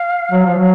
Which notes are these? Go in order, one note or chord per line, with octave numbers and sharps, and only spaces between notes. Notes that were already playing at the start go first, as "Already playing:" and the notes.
Already playing: F5
F#3
F3
F#3